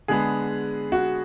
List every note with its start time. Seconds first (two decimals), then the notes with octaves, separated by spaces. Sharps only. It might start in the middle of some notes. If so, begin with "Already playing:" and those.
0.08 D3 G#3 B3 G#4
0.92 F#4